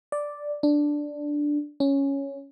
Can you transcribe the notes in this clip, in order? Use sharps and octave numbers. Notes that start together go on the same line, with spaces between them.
D5
D4
C#4